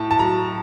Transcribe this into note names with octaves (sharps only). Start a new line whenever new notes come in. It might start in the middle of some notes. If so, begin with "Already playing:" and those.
Already playing: A2 A5
A5
F#3 A#5